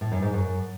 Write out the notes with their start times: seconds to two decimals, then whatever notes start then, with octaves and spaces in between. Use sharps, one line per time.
0.01 A2
0.12 F#2
0.22 G#2
0.33 F#2